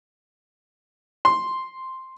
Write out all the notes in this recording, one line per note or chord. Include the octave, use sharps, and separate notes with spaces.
C6